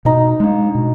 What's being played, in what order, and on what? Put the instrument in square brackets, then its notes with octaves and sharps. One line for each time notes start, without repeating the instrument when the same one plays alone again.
[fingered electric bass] B2 [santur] D#4
[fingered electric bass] G#3 D4
B2